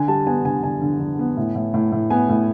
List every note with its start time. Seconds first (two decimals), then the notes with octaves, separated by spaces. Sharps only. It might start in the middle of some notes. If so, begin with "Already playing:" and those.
Already playing: D3 G#5
0.08 G3 A5
0.27 B3 G#5
0.45 D3 G#5
0.63 D3 G#5
0.82 D3
1.00 D3
1.19 B3
1.37 A2
1.55 A2
1.74 A2
1.92 A2
2.10 B3 G#5
2.29 A2